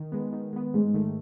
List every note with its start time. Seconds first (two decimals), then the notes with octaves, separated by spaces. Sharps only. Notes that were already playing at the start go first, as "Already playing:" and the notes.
Already playing: D#3
0.12 G#3 B3
0.33 D#3
0.53 G#3 B3
0.74 G#2 G#3
0.94 D#3 A3